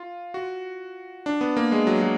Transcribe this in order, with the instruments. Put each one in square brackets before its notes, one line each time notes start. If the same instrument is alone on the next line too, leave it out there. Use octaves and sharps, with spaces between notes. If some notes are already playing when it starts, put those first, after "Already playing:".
Already playing: [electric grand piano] F4
F#4
D4
B3
A#3
G#3
F#3
F#3